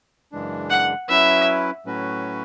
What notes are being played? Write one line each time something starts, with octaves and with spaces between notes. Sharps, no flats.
F#2 C#3 E3 G#3 D4
F#5
F#3 C#4 E4 B4 E5
A2 F#3 C#4 F#4 B4